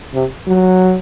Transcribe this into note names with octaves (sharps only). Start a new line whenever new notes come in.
C3
F#3